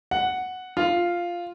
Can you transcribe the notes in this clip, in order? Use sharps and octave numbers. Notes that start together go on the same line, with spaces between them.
F#5
F4